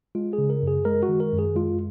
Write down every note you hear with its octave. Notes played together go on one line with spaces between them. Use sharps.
G#3 F4
G#4
C#3
A#4
F#2 G#4
G#3 A#4
F#4
D#3
A#4
F#2
G#4
G#3 F4